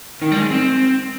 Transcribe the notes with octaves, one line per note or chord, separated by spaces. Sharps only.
D#3
G3
G#3
C4